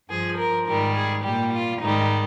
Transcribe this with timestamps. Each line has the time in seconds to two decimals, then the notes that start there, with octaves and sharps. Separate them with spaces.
0.09 G2 F3 G#4
0.38 A#4
0.67 G#2 D#3 G3 A#4
0.95 G#4
1.23 A#2 G3 G4
1.53 F4
1.81 G#2 D#3 G3 D#4